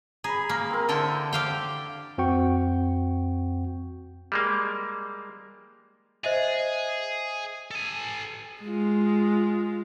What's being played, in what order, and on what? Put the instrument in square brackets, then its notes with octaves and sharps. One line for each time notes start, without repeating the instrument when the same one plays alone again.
[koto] G#4 [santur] A#5 B5
[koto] A#3 [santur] A#5
[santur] C4 A#4
[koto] D3 E4 G5 [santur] C5 A5
[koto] G4 F5 G5
[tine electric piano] F2 C4 F#4 G5 C#6
[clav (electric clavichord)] G3 G#3 A#3
[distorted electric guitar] G#4 [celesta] C5 D#5 E5
[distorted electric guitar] A4 G#5
[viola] G#3 F4